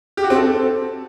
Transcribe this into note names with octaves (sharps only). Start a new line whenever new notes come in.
G4
F#4
C4
A4